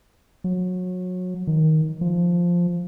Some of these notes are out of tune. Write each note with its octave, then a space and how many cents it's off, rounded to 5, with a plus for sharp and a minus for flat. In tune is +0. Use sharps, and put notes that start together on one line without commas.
F#3 -25
D#3 +10
F3 +0